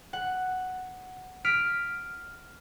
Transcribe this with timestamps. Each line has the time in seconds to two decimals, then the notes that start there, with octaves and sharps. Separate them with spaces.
0.13 F#5
1.45 D#6 F6 B6 D7